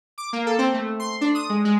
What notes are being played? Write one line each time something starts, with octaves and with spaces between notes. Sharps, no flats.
D6
A#3
A4
C4
A3
C6
D4
D#6
G#3
G#3